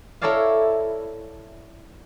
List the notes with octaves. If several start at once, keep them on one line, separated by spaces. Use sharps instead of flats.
E4 A4 A#4 C#5 D5 F5